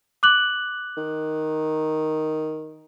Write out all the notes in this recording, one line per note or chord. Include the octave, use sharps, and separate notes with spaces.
D6 F#6 F#7
D#3